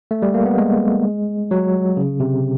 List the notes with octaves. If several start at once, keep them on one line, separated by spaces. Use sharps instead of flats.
A3
G3
A#3
B3
G#3
F#3
C#3
C3